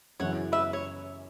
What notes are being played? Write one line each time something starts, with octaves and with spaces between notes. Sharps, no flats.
F#2 C#3 E3 C#4 C#5 F#5
B4 E5
C#5